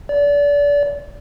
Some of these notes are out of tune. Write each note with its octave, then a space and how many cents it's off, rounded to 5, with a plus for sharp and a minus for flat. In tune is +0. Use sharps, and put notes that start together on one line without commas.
D5 -30